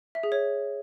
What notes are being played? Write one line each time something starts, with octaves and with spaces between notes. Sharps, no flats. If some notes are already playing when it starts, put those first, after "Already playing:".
E5
G#4
C#5